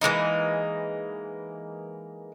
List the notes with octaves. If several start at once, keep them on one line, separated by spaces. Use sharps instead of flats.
E3 G#3 A#3 D#4